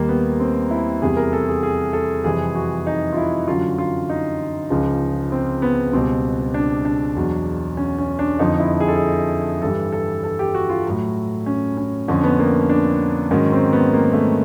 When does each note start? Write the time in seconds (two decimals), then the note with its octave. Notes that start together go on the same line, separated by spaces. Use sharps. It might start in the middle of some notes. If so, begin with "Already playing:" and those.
Already playing: D#2 D#3 G3 A#3
0.09 B3
0.40 C4
0.71 E4
1.02 E2 C3 E3 G3 G#4
1.16 A#4
1.33 A4
1.48 G#4
1.63 G#4
1.93 A4
2.24 F2 C3 E3 G3 G#4
2.55 F#4
2.87 D#4
3.13 F4
3.17 E4
3.47 F#2 D3 F#3 F4
3.78 F4
4.10 D#4
4.70 C#2 C#3 F3
5.32 C4
5.62 B3
5.93 C#2 B2 G3 C4
6.54 D4
6.85 D4
7.16 E2 B2 F#3
7.77 C#4
7.98 C#4
8.19 D4
8.39 F2 D3 F3 D#4
8.60 E4
8.80 G#4
8.88 A4
8.96 G#4
9.62 G2 E3 G3 A4
9.92 A4
10.24 A4
10.39 G4
10.55 F#4
10.70 F4
10.86 A2 F#3
11.46 C#4
11.77 C#4
12.08 F2 D3 F3 C#4
12.24 B3
12.39 A#3
12.69 D4
13.31 G#2 D#3 F#3 C#4
13.52 C4
13.73 B3
13.93 A#3
14.13 A3